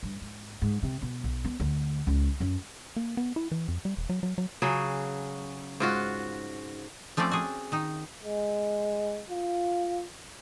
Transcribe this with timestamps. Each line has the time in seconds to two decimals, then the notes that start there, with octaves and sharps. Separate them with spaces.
0.03 G2
0.21 G#2
0.62 G#2
0.83 C3
1.02 B2
1.24 B1
1.45 B3
1.60 D2
2.07 C#2
2.40 F#2
2.97 A#3
3.17 B3
3.36 E4
3.52 E3
3.68 F2
3.85 G3
3.97 E1
4.10 F#3
4.23 F#3
4.38 F#3
4.62 C#3 F#3 G#4
5.80 G#2 F4 F#4
7.17 F3 A3 C4 C#4 D5
7.31 F#4 G#4
7.72 D#3 D#4
8.23 G#3
9.30 F4